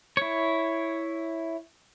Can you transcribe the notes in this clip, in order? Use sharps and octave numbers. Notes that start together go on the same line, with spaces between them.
E4 C#5